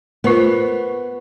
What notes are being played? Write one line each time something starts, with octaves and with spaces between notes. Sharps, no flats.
B3 F4 A#4 C5